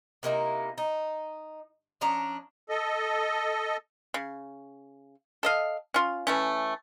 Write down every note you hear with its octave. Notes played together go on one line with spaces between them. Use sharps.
C3 A#3 D#4 E4
D#4
F3 C#4 D4 A#5
A4 D#5
C#3
A4 D#5 F5
C#4 F4
E3 A3 C#4